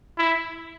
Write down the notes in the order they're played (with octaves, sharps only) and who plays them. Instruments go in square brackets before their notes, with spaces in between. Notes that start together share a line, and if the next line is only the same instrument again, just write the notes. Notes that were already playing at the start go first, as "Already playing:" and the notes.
[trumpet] E4